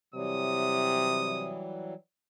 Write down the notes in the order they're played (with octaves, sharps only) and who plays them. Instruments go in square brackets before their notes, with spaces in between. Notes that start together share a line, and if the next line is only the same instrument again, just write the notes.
[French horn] C3 [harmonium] E3 F#3 G3 [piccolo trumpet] D#6